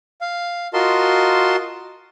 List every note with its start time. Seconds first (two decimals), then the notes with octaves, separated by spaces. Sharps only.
0.21 F5
0.74 F4 F#4 A#4 D#5 A5 C6